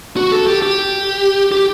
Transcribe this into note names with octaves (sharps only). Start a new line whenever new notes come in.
F#4
A4
G4
G4
G4